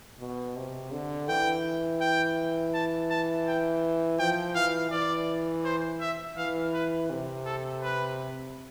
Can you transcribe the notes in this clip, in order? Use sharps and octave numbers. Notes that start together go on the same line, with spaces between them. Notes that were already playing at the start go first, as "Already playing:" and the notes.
B2
C3
D3
E3 G5
G5
A5
A5
G5
F3 G5
E3 F5
E3 D5
C5
E5
E3 F5
B4
C3
A4
B4